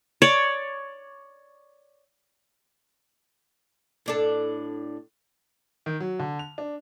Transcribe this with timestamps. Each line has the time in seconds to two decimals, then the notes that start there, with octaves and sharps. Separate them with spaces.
0.22 C#5 D5
4.06 A2 D4 A4
5.86 D#3
6.00 F#3
6.19 D3
6.39 F7
6.58 D4